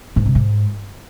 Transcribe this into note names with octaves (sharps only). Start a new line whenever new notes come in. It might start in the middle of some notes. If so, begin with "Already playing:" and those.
G#2
C3
G#2